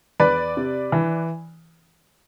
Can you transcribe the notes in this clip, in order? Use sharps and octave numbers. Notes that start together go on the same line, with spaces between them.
E2 B4 D5
C3
E3